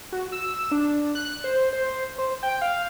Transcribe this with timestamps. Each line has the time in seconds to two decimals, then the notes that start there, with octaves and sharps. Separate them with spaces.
0.12 F#4
0.32 E6
0.71 D4
1.15 F#6
1.44 C5
1.73 C5
2.18 C5
2.43 G5
2.62 F5